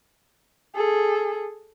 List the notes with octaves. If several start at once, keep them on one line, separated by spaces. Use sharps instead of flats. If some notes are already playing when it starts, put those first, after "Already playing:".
G#4 A4